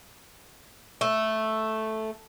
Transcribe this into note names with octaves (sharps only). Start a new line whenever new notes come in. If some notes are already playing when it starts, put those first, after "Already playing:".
A3